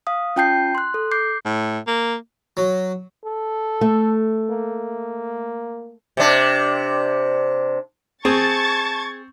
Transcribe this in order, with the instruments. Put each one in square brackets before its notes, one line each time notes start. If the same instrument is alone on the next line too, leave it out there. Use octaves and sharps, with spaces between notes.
[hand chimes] F5 D#6
C#4 F4 G5 A5 G6 C7
C6 F#6
A4
D6 G6 C7
[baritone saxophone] A2
A#3
[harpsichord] F#3
[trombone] A4
[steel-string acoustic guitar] A3
[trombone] A#3
[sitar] C3 D4
[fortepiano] C4 [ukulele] G#4 [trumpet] A5 [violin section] C#6 G#6 A6